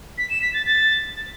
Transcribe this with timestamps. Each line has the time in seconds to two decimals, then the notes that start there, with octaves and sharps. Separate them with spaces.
0.18 B6
0.30 E7
0.42 B6
0.54 A6
0.66 A6